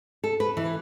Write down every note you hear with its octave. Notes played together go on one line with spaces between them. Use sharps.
A4
B4
E3